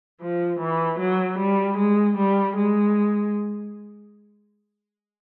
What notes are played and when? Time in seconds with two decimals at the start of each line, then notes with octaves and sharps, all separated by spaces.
0.21 F3
0.60 E3
0.99 F#3
1.39 G3
1.78 G#3
2.18 G3
2.57 G#3